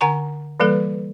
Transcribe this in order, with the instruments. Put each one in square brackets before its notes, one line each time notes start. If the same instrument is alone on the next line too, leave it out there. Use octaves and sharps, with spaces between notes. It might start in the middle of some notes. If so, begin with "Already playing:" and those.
[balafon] D3 F#5 G#5 A#5 C#6
E3 G3 A#3 A4 B4